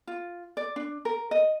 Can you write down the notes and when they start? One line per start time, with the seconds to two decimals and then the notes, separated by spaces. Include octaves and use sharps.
0.07 F4
0.57 D5
0.76 D4
1.05 A#4
1.31 D#5